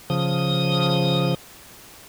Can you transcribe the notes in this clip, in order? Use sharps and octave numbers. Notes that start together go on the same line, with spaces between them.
C#3 F3 D#6